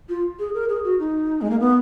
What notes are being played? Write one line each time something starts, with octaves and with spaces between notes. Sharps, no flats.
F4
G#4
A#4
G#4
F#4
D#4
G#3
A#3
B3